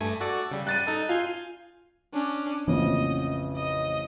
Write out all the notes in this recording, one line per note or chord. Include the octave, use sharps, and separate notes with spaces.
G2 A3 G#5
F#4 A4 D5
C#3 G3
G3 F#6 A6 D#7
D#4 A4
F4 F5 G#5 G6
C#4 D4
A1 F2 C#3 E3 A#3 C4 D#5
D#5